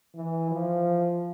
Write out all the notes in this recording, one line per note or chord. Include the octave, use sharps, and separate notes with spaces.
E3
F3